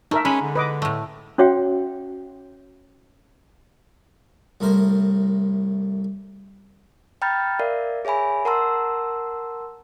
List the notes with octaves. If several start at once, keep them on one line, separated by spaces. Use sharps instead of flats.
A3 D#4 A#4 E5
G#3 C#4 B5
D3
B4 D#5 D6
A2 A3
C#4 F#4 C#5 E5 F#5 G5
C2 A2 A#4 C5
G5 A#5 B5 F6 G6 A6
A#4 D5 E5 F5
G#4 C#5 E5 G#5 B5
A#4 F#5 A5 A#5 C6 E6